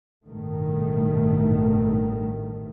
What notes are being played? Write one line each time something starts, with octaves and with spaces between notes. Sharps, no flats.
A1 G2 B2 D#3 A3